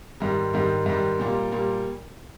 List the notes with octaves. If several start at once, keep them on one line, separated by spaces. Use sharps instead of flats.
G#2 D#3 G3
G#2 D#3 G3
G#2 D#3 G3
A#2 G3 A#3
A#2 G3 A#3